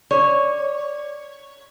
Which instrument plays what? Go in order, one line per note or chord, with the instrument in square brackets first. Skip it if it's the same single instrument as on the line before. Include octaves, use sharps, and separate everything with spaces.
[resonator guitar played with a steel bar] C#5 [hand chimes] D5